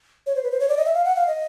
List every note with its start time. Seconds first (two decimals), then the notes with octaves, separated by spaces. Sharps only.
0.27 C#5
0.35 C5
0.43 B4
0.51 C5
0.60 C#5
0.69 D5
0.77 D#5
0.86 E5
0.94 F5
1.05 F#5
1.16 F5
1.27 D#5